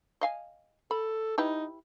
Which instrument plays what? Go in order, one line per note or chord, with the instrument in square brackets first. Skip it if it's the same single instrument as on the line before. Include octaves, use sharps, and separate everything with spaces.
[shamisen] D#5 F5 G#5
[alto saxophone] A4 [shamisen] B5
[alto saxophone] D#4 [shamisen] E4 G4 B4